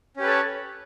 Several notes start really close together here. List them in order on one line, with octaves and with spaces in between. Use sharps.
C#4 G4 B4 A4 C#5